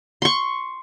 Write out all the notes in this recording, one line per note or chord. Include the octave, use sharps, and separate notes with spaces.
C6 C#6